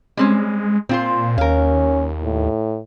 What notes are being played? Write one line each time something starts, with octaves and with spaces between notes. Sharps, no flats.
G3 G#3 C4 C#4
A#2 C4 F4 C5
D#2 C#4 A#4 F5
A2